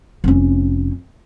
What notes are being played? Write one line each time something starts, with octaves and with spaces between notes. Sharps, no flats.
F1 C#4